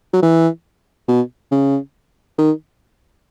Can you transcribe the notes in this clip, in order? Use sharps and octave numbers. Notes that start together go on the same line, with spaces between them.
F#3
E3
B2
C#3
D#3